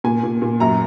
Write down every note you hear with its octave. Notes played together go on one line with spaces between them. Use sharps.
A#2 G#5
A#2
A#2
F#2 A#5